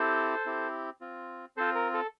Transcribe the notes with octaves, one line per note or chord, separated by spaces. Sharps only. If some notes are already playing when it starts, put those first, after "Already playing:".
Already playing: C4 E4 G4 A4 C5
C4 E4 G4
C4 F4
C4 F4 A4 C5
A#4
A4